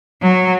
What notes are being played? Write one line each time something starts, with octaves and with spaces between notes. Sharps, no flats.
F#3